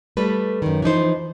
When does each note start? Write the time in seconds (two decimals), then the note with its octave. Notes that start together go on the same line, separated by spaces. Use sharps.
0.17 G3 A3 B4
0.62 F#2 D#3
0.82 E3 F3 D#4 C5